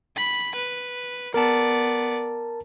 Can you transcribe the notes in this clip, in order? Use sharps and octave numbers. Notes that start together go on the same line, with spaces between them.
B5
B4
B3 A#4 D5 A5